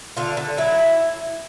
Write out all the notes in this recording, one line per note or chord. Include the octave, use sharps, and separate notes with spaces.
D3 F4
D3
F#3 E4